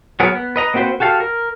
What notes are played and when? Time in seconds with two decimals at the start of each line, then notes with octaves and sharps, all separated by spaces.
0.20 F#3 B3 G#4 A#4
0.35 B3
0.56 B4 D#5 A#5
0.74 A#3 C4 F#4 B4 C5
1.00 F#4 G4 A4 F5
1.20 A#4